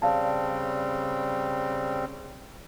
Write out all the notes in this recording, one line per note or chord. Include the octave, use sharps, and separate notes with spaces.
C#3 G3 C4 D5 F5 A5